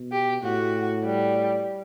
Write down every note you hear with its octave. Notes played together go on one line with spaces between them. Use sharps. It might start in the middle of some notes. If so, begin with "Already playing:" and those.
Already playing: B2
G4
A2 F#4
G3